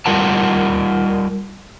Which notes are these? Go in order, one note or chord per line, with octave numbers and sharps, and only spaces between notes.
G3 F4 A#4 F#5 A5